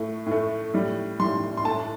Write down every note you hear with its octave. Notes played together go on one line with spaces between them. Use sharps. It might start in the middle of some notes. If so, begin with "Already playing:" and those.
Already playing: A2 A3
A2
A3
A2 G3
A2 G3 C6
C6
A2 A3 A5